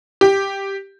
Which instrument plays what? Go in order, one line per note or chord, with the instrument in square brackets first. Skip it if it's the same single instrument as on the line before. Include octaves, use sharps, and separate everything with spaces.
[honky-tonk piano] G4